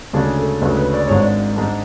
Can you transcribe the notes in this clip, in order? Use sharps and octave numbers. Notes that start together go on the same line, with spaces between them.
D2 C#3 G#3 D4 G#4
A4
D2 C#3 G#3 D4 B4
B4
D5
G#1 G#2 G#3 D4 C#5
D5
G#2 G#3 D4